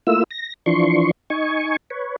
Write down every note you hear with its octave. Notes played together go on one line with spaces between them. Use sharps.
A3 A#3 E4 F4 E6
A#6
E3 F3 D4 C6 C#6
D#4 G#5 C#6
B4 C#5